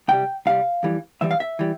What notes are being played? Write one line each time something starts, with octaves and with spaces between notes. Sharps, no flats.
C2 C3 G3 G5
C2 C3 G3 F5
F2 E3 G3
F2 E3 G3 E5
F5
E5
E3 G3